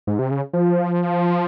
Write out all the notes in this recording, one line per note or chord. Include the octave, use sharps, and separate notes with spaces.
G#2
C3
C#3
F3